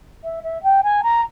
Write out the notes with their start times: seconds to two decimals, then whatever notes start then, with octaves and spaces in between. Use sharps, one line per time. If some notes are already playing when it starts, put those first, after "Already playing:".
0.23 E5
0.43 E5
0.63 G5
0.83 G#5
1.03 A#5